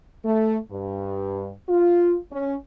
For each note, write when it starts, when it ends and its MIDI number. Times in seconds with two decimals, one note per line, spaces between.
0.25 0.58 57
0.71 1.51 43
1.69 2.16 65
2.32 2.54 61